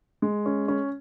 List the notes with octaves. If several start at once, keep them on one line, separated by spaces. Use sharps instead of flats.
G#3
C#4
C#4